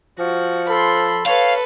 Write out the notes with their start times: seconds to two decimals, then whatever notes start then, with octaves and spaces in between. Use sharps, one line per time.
0.19 F3 F#4
0.69 A4 B5 C6
1.26 A4 B4 C#5 F5